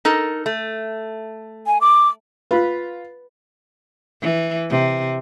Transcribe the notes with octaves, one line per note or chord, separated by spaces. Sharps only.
D#4 A4 A#4
A3
G#5
D6
F4 B4 B5
E3
C3